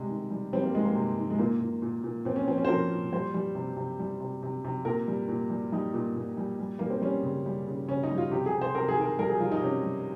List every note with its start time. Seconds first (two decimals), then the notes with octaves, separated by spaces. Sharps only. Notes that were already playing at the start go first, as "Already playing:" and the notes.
Already playing: C3 G3 G#3
0.09 D#3
0.31 G3
0.53 G3 C4
0.63 A#3
0.75 D#3 G#3
0.85 A#3
0.95 C3
1.18 D#3
1.30 G#3
1.39 A#2 A#3
1.60 A#2
1.82 A#2
2.04 A#2
2.25 A#2 C4
2.36 C#4
2.48 F3 C4
2.58 C#4
2.65 C5
2.69 F3 A#4
2.91 A#2
3.13 G3 C5
3.34 G3
3.55 C3
3.77 C3
4.00 G3
4.20 C3
4.43 C3
4.64 C3
4.85 A#2 A#4
5.08 G3
5.28 A#2
5.50 G3
5.72 G3 D#4
5.94 A#2
6.16 A#2
6.37 G3
6.59 G3
6.79 G3 A#3
6.90 C4
7.02 G3 C#4
7.23 C#3
7.46 G3
7.67 C#3
7.88 C#3 C#4
8.03 D#4
8.11 G3
8.18 F4
8.31 C3 G4
8.46 G#4
8.53 C3
8.62 C5
8.75 C3 A#4
8.88 G#4
8.97 D#3 A#4
9.19 G3 A#4
9.30 G#4
9.40 G3 F4
9.51 D#4
9.61 C3 C#4
9.83 G3